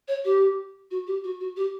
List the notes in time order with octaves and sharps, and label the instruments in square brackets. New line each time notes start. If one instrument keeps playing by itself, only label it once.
[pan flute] C#5
G4
F#4
G4
F#4
F#4
G4